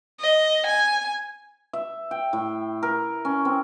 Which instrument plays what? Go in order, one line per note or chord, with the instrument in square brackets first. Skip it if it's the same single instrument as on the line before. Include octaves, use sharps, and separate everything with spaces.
[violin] D#5
G#5
[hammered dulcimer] E5
G5
A2
A#4
C#4
C4